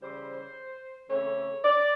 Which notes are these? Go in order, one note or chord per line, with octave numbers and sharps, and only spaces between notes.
C#3 E3 G3 C5
C#3 E3 A3 C4 C#5
D5